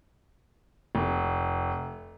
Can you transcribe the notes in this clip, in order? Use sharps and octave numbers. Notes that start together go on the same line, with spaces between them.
F1